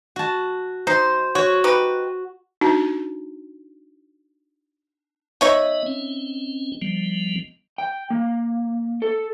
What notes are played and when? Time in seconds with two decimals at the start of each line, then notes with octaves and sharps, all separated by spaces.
0.16 F#4 A5
0.87 D#4 C5
1.35 F#4 C#5
1.64 D#4 G4 B4
2.61 D4 D#4 F#4 A5
5.41 B3 D#4 C#5 D#5 E5
5.86 C4 C#4
6.82 F3 G3 B3
7.78 G5
8.10 A#3
9.02 A4